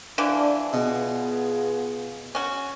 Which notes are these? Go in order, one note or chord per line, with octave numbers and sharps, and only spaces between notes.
D3 E3 F3 D4
B2 B3 F4 G#4
C#4 F#4